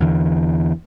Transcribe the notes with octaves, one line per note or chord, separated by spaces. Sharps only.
E2 D3 E3